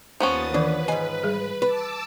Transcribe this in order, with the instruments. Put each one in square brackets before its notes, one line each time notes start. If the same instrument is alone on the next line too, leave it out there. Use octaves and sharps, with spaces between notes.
[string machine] D#2 D#6 A6 [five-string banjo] F3 B3 C#4
[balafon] D#3 E3 A#4 [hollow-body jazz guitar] D4 [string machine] B4
[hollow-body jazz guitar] G#2 G#5 [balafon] D#5
[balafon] G3 G#4
[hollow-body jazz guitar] B4 [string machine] A5 D6 E6